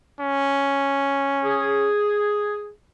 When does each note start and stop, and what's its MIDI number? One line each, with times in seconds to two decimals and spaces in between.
0.20 1.90 61
1.44 2.69 68